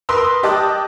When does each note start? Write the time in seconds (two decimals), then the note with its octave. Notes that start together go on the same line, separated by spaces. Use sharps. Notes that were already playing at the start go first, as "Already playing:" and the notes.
0.09 A#4 B4 C6 D#6 E6
0.43 G4 D#5 A5 D6 F#6